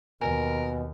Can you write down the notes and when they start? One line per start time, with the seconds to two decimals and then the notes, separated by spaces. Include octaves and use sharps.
0.21 D#2 B2 A#4 G#5